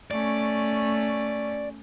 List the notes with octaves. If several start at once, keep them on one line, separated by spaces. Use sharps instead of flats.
A3 C#4 D5